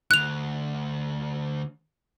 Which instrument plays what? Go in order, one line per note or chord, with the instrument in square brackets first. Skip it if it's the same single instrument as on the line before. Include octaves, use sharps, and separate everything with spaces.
[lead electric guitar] D2 G2 [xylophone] F#6 F7